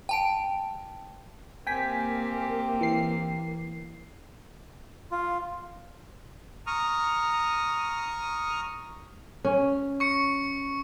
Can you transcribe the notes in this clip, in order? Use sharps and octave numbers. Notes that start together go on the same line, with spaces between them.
G5 A5 D7
A#3 C4 G4 G5 G#5 B6
E3 C7
F4
A#5 C#6 D#6 F6
C#4
C#6 C#7